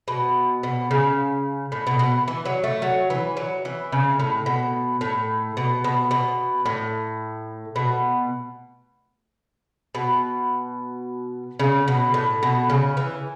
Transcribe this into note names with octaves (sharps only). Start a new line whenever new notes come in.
B2
B2
C#3
A2
B2
B2
E3
F#3
A3
F#3
E3
F#3
E3
C#3
A2
B2
A2
B2
B2
B2
A2
B2
B2
C#3
B2
A2
B2
C#3
E3